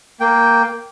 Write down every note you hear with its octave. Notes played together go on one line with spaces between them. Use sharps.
A#3 G5